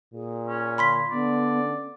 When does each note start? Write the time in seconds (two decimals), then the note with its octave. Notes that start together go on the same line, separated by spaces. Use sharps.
0.14 A#2 G#4
0.48 C#4
0.78 D3 B5 C6 B6
1.11 D3 B3 D5
1.63 C#4